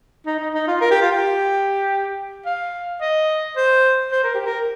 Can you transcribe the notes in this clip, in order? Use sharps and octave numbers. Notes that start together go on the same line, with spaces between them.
D#4
D#4
D#4
F4
A#4
G4
F4
G4
F5
D#5
C5
C5
A#4
G4
A#4